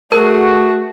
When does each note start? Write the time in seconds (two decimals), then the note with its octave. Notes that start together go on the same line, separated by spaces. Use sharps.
0.12 A3 F#4 G#4 A#4